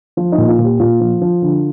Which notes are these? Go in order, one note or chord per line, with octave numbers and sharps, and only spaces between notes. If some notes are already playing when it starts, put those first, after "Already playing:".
F3 F4
D#4
A#2
F4
A#2
G4
A#2 F4
F3
F3
D3